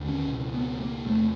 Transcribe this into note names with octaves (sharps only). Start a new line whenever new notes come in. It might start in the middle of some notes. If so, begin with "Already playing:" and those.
Already playing: D#2 D3
C#4
C#2 B2
B3
A#3
E2 C3 A3